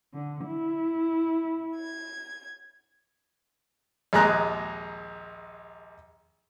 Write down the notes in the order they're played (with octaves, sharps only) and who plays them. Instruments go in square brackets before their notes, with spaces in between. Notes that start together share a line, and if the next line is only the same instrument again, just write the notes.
[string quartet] D3
E4
G#6
[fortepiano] A#1 D#2 G#3 G#4 A#5 F#6